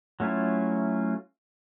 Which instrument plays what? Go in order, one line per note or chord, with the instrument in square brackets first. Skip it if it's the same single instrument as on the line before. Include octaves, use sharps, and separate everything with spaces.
[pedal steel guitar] F#3 A3 C#4 E4 F4